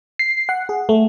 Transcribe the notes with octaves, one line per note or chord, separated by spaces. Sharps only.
C7
F#5
G#4
A3